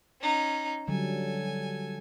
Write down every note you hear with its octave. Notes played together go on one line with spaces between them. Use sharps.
C#4 D#4
D3 F#3 G3 A4 G#5